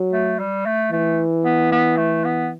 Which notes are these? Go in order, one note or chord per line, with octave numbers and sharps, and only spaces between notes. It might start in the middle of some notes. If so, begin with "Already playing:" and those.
Already playing: F#3
A3
G3
A3
E3 A3
B3
B3
A3
B3